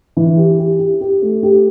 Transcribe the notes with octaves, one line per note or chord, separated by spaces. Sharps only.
E3
G4
G4
G4
G4
A3
G4